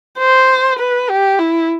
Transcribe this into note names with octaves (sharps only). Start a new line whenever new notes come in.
C5
B4
G4
E4